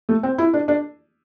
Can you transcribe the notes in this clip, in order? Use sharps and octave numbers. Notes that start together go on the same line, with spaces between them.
A3
C4
E4
D4
D4